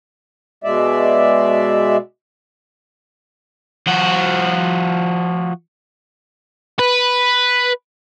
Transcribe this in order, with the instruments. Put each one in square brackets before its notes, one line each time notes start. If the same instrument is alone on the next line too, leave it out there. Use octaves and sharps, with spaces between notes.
[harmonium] B2 G#3 D5 E5
[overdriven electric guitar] F3 F#4
B4